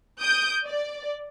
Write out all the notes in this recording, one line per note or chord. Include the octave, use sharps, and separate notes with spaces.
D#6 G6 D7
D5